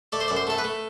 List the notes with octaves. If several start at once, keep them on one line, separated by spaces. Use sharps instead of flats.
A3 D5
C5
F#2 D5
C5
A3 A4
B4
A3